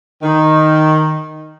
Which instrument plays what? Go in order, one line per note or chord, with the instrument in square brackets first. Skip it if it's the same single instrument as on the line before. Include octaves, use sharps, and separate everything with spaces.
[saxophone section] D#3